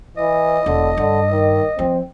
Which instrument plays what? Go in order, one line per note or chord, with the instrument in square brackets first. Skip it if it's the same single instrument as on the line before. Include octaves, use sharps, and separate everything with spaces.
[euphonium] E3 [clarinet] D#5
[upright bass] E1 [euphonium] D3
[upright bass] G2 [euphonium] D3
[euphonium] D#3
[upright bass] F3 [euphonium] C4